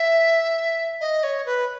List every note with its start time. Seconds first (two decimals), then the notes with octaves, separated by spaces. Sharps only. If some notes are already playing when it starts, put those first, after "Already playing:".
Already playing: E5
1.01 D#5
1.23 C#5
1.46 B4